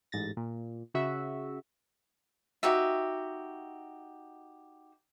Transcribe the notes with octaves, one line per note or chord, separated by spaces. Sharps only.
A1 G#2 A6 A#6
A#2
C#3 F#4 E5
D#4 F#4 G4 E5